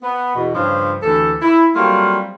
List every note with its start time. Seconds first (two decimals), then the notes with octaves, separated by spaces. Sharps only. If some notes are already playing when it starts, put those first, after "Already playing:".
0.03 B3
0.36 E2 B2
0.55 G2 C#3 F3
1.02 D2 E3 G4 A4
1.42 E4
1.76 F#3 G3 A3 A#3 C4 F4